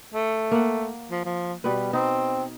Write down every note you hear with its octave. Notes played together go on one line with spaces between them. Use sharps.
A3
A#3 F#5
F3
F3
B2 G3 B4
C4 D#4